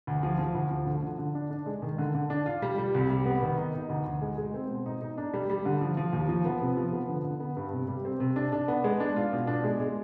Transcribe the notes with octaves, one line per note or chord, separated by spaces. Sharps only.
D2
F3
F3
D2
F3
D3
D3
D3
D4
D4
G#3
D#3
D3
D3
D4
F4
G3
G3
C2
G3
B3
D#3
D#4
D#4
D2
D2
G#3
G#3
C4
B2
D#4
D#4
D4
G3
G3
D3
F3
F3
D#2
F3
B3
C3
F3
B3
D3
D3
B3
G2
C3
G3
C4
C3
D4
D4
B3
G#3
D4
F4
B2
D4
G#3
G#3